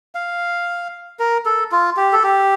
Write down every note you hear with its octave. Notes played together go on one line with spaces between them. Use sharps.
F5
A#4
A4
F4
G4
A4
G4